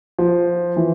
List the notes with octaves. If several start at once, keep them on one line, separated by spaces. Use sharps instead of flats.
F3
E3